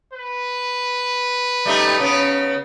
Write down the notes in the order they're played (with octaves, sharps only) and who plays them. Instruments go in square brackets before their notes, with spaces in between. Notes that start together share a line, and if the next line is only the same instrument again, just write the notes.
[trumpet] B4
[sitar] G3 A3 D#4
C#3 B3